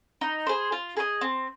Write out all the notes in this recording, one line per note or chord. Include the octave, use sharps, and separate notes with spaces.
D#4
G#4 C5
F4
G#4 C5 D#5
C4